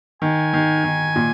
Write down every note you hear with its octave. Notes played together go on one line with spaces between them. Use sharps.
D#3 G#5
D#3
D#3
A#2